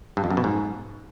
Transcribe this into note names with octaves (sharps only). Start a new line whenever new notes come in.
G2
F2
F#2
B2
G#2